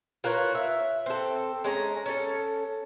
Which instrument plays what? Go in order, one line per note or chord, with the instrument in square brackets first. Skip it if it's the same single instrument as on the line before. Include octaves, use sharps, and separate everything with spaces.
[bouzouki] F4 A#4 B4 C#5
E5
C4 A4
G#3 C#4 A#5
C#4 A4